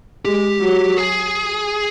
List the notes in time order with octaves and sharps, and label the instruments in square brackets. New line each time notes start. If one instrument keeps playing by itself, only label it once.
[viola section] G#3 [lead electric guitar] G4
[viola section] F#3
[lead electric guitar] G#4